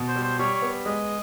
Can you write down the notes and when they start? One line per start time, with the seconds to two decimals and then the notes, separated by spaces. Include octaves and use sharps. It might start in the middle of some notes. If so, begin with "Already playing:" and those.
Already playing: B2
0.08 C5
0.16 G3
0.23 C5
0.39 G3 C#5
0.54 C#5
0.62 B3
0.85 G#3 D#5